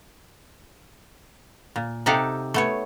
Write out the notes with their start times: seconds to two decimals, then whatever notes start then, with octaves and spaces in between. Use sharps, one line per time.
1.76 A#2
2.06 C3 D#4 G4 A4 F5 F#5
2.54 A3 B3 C#5